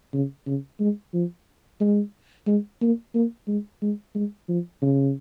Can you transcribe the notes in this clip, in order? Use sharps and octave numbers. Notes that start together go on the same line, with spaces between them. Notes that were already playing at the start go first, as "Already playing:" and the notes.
C#3
C#3
G#3
F3
G#3
G#3
A#3
A#3
G#3
G#3
G#3
F3
C#3